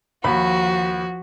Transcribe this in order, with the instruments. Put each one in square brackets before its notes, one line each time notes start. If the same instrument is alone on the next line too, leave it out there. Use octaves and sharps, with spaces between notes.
[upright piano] D#2 B5 [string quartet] F3 F#4